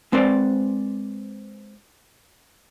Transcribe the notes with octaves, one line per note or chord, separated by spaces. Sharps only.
G#3 C4 B4 C5 D5